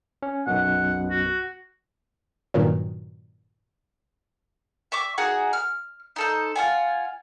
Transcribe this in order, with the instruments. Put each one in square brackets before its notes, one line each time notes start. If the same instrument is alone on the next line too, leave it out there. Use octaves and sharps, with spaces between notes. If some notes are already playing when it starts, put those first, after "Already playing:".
[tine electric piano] C#4
[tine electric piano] B1 F#2 B2 [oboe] F#5
[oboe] F#4
[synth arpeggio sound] G2 A#2 D#3 F#3
[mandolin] E5 C#6 D6
D#4 F#4 G#4 F#5
F6
D#4 A4 C5
F4 F#5 G#5